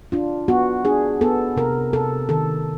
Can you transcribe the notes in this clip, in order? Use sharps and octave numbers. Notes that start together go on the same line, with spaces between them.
D4 F4
B3 F#4
D4 G#4
B3 A4
C3 A#4
C3 A4
D#3 A4